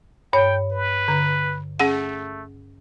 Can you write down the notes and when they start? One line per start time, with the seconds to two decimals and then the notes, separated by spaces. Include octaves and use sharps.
0.33 G2 C#5 G5
0.71 B4
1.08 D3
1.80 A3 C#4 G#4 F#5